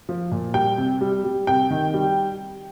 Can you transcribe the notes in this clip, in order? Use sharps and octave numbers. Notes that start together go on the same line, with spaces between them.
F3
A#2
G3 G5
C3
G3
G3
C3 G5
D#3
G3